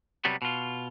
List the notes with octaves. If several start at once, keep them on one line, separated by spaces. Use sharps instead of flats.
C3 F#3 G3 B3
B2 F4